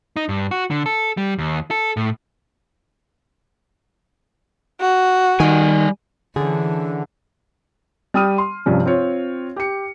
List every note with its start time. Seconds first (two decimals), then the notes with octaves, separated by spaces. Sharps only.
0.16 D#4
0.29 G2
0.51 F#4
0.71 D3
0.86 A4
1.17 G3
1.38 D#2
1.71 A4
1.97 A2
4.80 F#4
5.40 D#3 G3 G#5
6.36 D3 E3 C#4 G#4
8.14 G3 G5 D#6 F6 D#7
8.38 C6
8.66 G2 C3 F3 C#4
8.85 C4 F4 C#5
9.56 G4 C#7